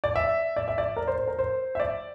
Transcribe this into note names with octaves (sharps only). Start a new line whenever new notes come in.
D5
E5
D5
E5
D5
A#4
C5
C5
A#4
C5
E5
D5